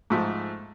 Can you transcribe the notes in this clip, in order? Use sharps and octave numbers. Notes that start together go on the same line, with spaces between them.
G#2 F3 A3